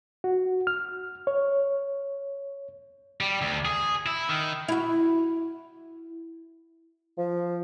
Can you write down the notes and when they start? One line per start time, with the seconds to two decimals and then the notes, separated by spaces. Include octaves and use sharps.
0.24 F#4
0.67 F6
1.27 C#5
3.21 G3
3.42 D2
3.65 G#4
4.06 E4
4.29 D#3
4.68 E4 F#4
7.18 F3